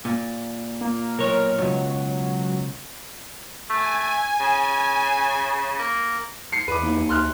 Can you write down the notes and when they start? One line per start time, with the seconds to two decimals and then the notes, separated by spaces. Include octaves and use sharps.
0.05 A#2
0.81 A#3
1.19 B1 A#4 C#5
1.58 C#2 G2 F#3
3.70 A3 G#5
4.40 C#3
5.79 A#3
6.52 C7 C#7
6.68 E2 B4 D6
6.82 D#2
7.09 D2 C6 F6 F#6